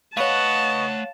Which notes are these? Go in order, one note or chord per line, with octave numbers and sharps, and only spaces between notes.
A3 B4 C#5 D#5 F5 F#5 A5 C#6